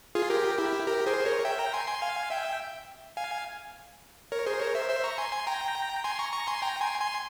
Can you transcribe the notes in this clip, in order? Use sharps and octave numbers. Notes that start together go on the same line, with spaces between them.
F4 G#4
G4 A#4
E4 G4
G4 A#4
G#4 C5
A#4 C#5
E5 G5
G5 A#5
G#5 C6
G#5 C6
F5 G#5
E5 G5
F5 G#5
A#4 C#5
G#4 C5
A#4 C#5
C5 E5
C5 E5
A#5 C#6
G#5 C6
G#5 C6
G5 A#5
G#5 C6
A#5 C#6
A#5 C#6
G#5 C6
G5 A#5
G#5 C6
G#5 C6